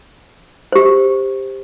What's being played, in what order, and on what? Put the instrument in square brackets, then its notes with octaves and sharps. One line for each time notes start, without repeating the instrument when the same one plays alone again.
[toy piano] G4 C5